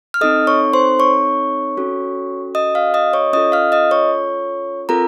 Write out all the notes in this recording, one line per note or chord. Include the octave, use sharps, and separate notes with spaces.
F6
C4 D#4 A4 D#5 D#6
C#5 C#6
C5 C6
C#5 C#6
C#4 F#4 A4
D#5 D#6
F5 F6
D#5 D#6
C#5 C#6
C#4 F4 A4 D#5 D#6
F5 F6
D#5 D#6
C#5 C#6
C4 F4 A4 A#4 A#5